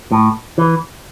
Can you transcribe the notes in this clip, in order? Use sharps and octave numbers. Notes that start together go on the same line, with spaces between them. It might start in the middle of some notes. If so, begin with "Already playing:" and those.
A2
E3